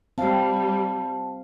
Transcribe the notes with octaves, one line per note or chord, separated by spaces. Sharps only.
G3 C4 F5 A5